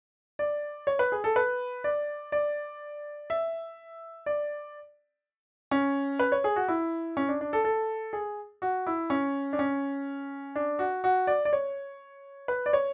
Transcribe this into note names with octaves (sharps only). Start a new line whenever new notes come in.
D5
C#5
B4
G#4
A4
B4
D5
D5
E5
D5
C#4
B4
C#5
G#4
F#4
E4
C#4
D4
D4
A4
A4
G#4
F#4
E4
C#4
D4
C#4
D4
F#4
F#4
D5
D5
C#5
B4
D5
C#5